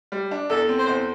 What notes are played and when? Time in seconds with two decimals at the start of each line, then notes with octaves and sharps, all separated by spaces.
0.12 G3
0.31 D4
0.50 E2 A4
0.69 C4
0.79 C5
0.88 E2